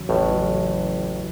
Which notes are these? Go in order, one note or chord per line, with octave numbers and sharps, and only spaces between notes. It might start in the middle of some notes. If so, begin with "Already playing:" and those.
Already playing: E2 C#3 F#3 C#4
A1 A2
E2 C#3 F#3 C#4 F#4